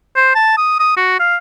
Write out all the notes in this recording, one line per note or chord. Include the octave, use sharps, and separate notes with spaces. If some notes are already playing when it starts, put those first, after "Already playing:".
C5
A5
D#6
D#6
F#4
F5